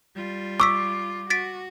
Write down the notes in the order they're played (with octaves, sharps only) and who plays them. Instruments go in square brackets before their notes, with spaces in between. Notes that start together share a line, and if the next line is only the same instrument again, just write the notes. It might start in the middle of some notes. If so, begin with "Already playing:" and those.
[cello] G3 F4
[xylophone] C#6 E6 B6 [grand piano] D6
[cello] F#4 [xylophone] A6 B6 D7